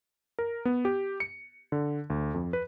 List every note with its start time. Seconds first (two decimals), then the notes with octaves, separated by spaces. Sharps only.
0.39 A#4
0.65 B3
0.85 G4
1.20 C#7
1.72 D3
2.10 D2
2.34 F2
2.53 B4